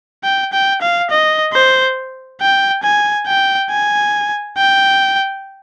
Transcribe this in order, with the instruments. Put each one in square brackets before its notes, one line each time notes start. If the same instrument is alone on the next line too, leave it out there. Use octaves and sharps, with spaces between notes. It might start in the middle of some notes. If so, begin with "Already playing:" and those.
[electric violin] G5
G5
F5
D#5
C5
G5
G#5
G5
G#5
G5